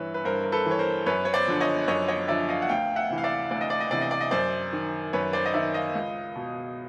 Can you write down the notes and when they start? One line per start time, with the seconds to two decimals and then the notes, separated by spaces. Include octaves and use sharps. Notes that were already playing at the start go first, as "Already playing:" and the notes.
Already playing: G2 E3 B4 C#5 E5
0.14 B4
0.25 G2 A#4 C5
0.43 A#4
0.52 A4 B4
0.66 E3
0.71 C#5
0.79 A#4 C5
1.06 F#2 B4 C#5
1.25 C#5
1.33 C5 D5
1.47 D3 F3
1.61 C#5 D#5
1.88 F#2 C#5 D#5
2.08 C#5 D#5
2.28 D3 F3 D5 E5
2.49 D#5 F5
2.62 F#5
2.69 D2 F5 G5
2.96 E5 F#5
3.09 C3 E3
3.18 F5
3.24 D5 E5
3.50 D2 D5
3.61 D#5
3.70 D5
3.80 D#5
3.91 C3 E3 D5
4.01 D#5
4.11 D5
4.21 D#5
4.31 F#2 C5 D5
4.73 D#3
5.13 F#2 B4 C#5
5.33 C5 D5
5.46 D#5
5.54 D#3 D5 E5
5.74 D#5 F5
5.95 C#2
6.35 B2